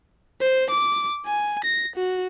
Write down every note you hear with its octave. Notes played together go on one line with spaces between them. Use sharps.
C5
D6
G#5
A#6
F#4